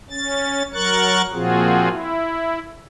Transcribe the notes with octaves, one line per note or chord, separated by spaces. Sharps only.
C#4 A6
F#3 A#4 C#6 F#6 A6
A#2 F3 C4 F4 F#4 G#4
E4